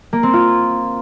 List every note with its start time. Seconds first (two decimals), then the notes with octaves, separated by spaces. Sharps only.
0.13 A#3
0.23 C4
0.33 F4